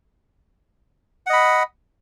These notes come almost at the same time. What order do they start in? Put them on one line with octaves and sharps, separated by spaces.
F#5 D#5 B5